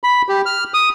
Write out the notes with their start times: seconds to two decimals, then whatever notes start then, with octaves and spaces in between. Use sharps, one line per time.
0.04 B5
0.29 G4
0.46 F6
0.74 D#6